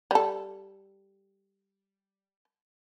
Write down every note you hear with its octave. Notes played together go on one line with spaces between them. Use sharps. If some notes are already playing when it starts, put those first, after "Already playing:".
G3 A4